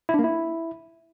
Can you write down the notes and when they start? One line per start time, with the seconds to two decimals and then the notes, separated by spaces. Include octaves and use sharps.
0.09 E4
0.14 D4
0.19 A#3
0.24 E4